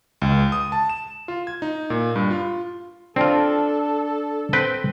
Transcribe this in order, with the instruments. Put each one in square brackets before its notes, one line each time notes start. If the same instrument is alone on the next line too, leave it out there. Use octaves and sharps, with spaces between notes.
[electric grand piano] C#2
D#6
A5
E7
F4
G#6
D#4
A#2
G2
F4
[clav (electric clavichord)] C4 F4 [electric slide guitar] D4 [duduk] A4
[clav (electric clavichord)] C4 B4 G5